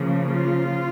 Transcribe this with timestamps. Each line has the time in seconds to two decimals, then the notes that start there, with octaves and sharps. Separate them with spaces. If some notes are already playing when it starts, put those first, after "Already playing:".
Already playing: C#3 F3 A#3
0.30 F4